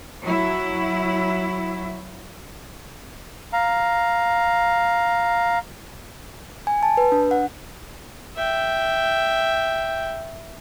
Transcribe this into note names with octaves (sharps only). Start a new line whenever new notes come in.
F#3 E4
F5 A#5
G#5
A5
B4
D4
F#5
E5 G5